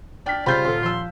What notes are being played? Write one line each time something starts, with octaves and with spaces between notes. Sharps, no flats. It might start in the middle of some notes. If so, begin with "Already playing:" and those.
D4 D5 G5 F6 B6
C#3 G3 F4 C5 B5 G6 A6 B6
D#1 A4 C6
F3 C6 E6